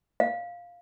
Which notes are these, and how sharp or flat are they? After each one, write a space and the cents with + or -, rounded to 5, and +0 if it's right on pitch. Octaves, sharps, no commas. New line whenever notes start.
F5 +5